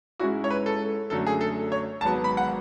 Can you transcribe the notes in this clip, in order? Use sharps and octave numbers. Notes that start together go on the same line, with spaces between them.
G#2 G#3 C#4 E4 F#4
C#5
B4
A4
F#2 D3 F#3 A3 A4
G#4
A4
C#5
G#1 G#2 F#3 B3 A5
B5
F#5